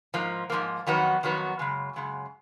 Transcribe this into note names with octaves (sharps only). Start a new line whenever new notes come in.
G#2 F3 A#3
G#2 F3 A#3
F2 D#3 F#3 B3 F#4
F2 D#3 F#3 B3 F#4
F#2 C#3 G#3
F#2 C#3 G#3